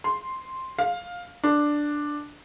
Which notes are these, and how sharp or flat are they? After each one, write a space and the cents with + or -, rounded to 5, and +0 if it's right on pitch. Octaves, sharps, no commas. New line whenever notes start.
C6 +0
F5 +15
D4 +5